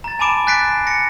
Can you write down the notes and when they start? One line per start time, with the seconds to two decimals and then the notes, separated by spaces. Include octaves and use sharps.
0.04 A#5 A6
0.19 G#5 A5 B5 D6 D7 E7
0.47 G#5 F#6 A6 B6 C7 D7
0.87 A#6 C#7